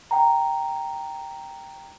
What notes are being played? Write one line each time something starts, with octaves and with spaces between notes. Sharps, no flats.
G5 A#5